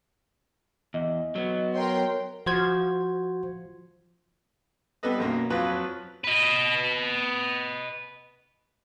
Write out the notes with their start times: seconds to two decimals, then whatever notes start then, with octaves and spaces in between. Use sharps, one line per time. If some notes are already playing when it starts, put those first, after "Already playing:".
0.94 E2 D#5
1.36 F#3 B3
1.75 A#4 C#5 G5 C6
2.46 F3 F#4 C5 G#6
5.03 G3 B3 D4 A4 B4 D#5
5.18 B1 F#2 A#3
5.50 F2 F3 F#3 B4
6.24 B4 D#5